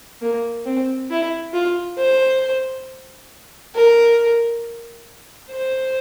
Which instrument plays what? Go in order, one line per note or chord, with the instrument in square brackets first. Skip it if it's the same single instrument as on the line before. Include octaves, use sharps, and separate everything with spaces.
[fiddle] A#3
C4
E4
F4
C5
A#4
C5